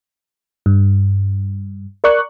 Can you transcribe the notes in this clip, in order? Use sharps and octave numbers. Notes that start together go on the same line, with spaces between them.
G2
A#4 D5 C#6 F#6